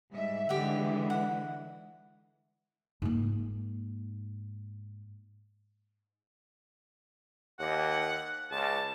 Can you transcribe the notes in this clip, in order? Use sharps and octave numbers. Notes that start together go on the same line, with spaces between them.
G#2 G3 E5
D3 E3 G#3 G4 E5 F#5
F#5
G#2 A#3
D#2 F#5
C#2 A5